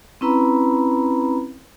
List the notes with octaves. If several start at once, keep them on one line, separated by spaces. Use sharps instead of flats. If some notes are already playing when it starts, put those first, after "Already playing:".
C4 C#4 E4 B4 A#5 B5